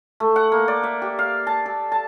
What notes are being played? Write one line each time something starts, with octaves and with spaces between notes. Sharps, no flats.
A3
F#5
A#3
D5
E5
G4
F5
A5
A4
A5